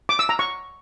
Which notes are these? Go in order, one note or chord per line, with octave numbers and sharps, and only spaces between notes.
D6
E6
A#5
C#6